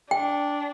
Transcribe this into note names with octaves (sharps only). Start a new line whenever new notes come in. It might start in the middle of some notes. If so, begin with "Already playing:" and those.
D4 G5